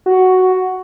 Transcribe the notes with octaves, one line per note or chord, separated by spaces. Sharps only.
F#4